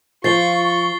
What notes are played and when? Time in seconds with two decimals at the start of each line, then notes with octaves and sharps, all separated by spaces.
0.24 F3 F4 C#6 A6 C7 G7